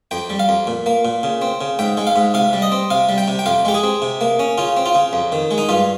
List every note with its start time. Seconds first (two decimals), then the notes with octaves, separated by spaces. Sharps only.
0.11 F2 G5
0.30 G3
0.39 F5
0.49 F2
0.67 A#2
0.86 A#3
1.05 A#2
1.23 C#3
1.42 C4
1.61 C#3
1.79 G#2 G5
1.97 G#3
2.07 F5
2.16 G#2
2.34 C3 F5
2.53 G3
2.62 D#5
2.72 C4
2.91 C3 F5
3.09 G3
3.18 G5
3.28 C3
3.39 G5
3.46 F2 F5
3.65 G#3 G4
3.74 G#4
3.83 C4
4.02 C3
4.21 A#3
4.39 C#4
4.58 C#3 F4
4.77 C4
4.86 F4
4.95 C#3
5.13 F2
5.32 D#3
5.51 G#3
5.58 D#4
5.69 G2 F4